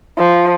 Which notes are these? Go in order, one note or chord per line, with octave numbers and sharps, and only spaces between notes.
F3